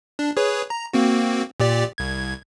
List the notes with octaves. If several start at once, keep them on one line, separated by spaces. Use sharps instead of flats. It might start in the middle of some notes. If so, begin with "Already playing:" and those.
D4
G#4 B4 C#5
A#5
A#3 C4 F#4
A#2 G4 D5
C2 G#6